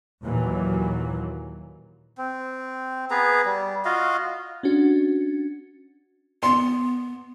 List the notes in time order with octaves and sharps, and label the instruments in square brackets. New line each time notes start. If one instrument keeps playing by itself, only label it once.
[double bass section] D#2 A#2 E3 F#3
[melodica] C4
B3 G#4 B4 A#5
G3
F4 F#4 D#5 F5
[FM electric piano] C#4 D4 F#4
[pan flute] B3 [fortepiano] C6